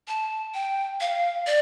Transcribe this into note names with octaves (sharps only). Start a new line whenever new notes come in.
A5
G5
F5
D5